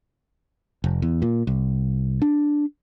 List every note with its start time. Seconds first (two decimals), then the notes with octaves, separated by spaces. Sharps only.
0.84 F1
1.02 E2
1.22 A#2
1.47 C2
2.22 D4